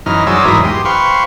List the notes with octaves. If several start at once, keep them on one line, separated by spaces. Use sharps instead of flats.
F#2 E3 D#4 F6
F#2 F#3 G#4 C5 D5 E6
E2 G#2 E4 A#4 D#6
G4 C6
B4 C5 F5 G5 C#6